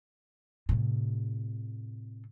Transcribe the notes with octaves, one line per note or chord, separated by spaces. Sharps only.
A2 C3